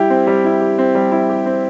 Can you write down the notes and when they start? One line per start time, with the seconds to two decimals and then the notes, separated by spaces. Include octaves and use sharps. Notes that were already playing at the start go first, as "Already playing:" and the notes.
Already playing: G3 E4 G4
0.10 C4
0.27 G3
0.44 E4
0.61 G4
0.78 C4
0.95 G3
1.12 E4
1.30 G4
1.46 C4